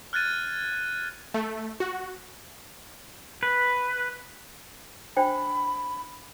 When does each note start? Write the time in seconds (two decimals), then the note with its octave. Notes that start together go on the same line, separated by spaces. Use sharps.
0.13 F6 F#6 G#6 A6 D#7
1.34 A3
1.80 F#4
3.43 B4
5.17 D4 C5 G5 B5